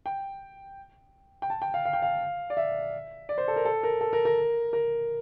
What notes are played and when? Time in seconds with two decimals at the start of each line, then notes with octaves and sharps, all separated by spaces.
0.06 G5
1.42 G5
1.50 A5
1.62 G5
1.74 F5
1.85 F5
1.93 G5
2.02 F5
2.50 D5
2.57 E5
3.29 D5
3.38 C5
3.48 A4
3.56 A#4
3.65 A4
3.83 A#4
4.01 A4
4.13 A#4
4.25 A#4
4.73 A#4